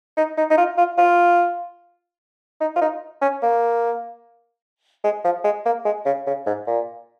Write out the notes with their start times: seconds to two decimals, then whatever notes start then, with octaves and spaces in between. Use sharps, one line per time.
0.17 D#4
0.38 D#4
0.50 D#4
0.57 F4
0.78 F4
0.98 F4
2.60 D#4
2.76 F4
2.81 D#4
3.22 C#4
3.42 A#3
5.04 G#3
5.24 F3
5.44 G#3
5.66 A#3
5.85 G#3
6.06 C#3
6.27 C#3
6.46 G#2
6.67 A#2